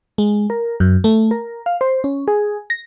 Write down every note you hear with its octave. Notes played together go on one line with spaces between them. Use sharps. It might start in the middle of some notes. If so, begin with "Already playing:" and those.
G#3
A#4
F#2
A3
A#4
F5
C5
C#4
G#4
A#6